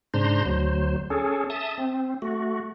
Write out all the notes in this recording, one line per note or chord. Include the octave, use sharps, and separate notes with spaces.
G#2 C#3 D4 C5 A#5 C6
D2 F#3 C5
C#4 G#4 A4
E5 A5 D#6
C4
A3 F#4